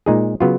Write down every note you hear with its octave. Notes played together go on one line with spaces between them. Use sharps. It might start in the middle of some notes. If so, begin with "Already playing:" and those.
A#2 G#3 D#4 G#4
C#3 F#3 B3 F4